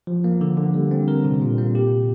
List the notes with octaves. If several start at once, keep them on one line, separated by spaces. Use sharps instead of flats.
F3
A#3
D3
D3
G3
C4
A#4
C3
A#2
A#3
G4